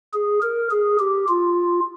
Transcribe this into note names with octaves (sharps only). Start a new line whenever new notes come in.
G#4
A#4
G#4
G4
F4